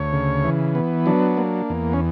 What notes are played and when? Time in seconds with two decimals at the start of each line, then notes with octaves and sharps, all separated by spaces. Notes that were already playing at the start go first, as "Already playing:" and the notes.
Already playing: D2 C#5
0.13 C#3
0.44 E3
0.75 B3
1.06 F#3 D4
1.37 A#3
1.70 E2
1.93 C#4